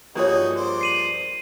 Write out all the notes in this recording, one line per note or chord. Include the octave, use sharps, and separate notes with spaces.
G2 F3 A#3 D#4 F#4 G#4 C#5 D#6
C5 D5
C7 D#7 F#7